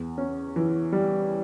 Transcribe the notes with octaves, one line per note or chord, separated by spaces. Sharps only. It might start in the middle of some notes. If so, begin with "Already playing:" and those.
Already playing: E2
C#4
E3
G3